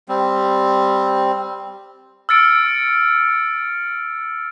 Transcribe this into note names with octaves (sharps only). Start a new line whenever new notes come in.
G3 C4
E6 F6 A6 C#7 D7